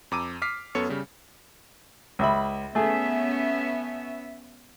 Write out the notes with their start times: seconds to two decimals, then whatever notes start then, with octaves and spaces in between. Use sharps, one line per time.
0.11 F2 A#5 D6 E6 D#7
0.42 D6 F6 B6 C7
0.75 F#2 B3 A4 C#5 C#7
0.89 C#3 G3
2.19 C#2 E5 B5
2.75 A3 B3 C#4 G#4 E5